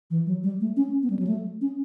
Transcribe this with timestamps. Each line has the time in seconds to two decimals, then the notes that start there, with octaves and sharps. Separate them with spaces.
0.10 E3
0.26 F#3
0.43 G3
0.61 A3
0.77 C#4
1.03 B3
1.10 G3
1.19 F#3
1.27 A3
1.61 C#4